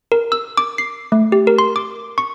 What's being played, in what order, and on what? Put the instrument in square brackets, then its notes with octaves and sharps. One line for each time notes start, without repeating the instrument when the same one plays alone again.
[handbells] A#4
E6
D6
C7
A3
G4
A#4
C6
D6
C#6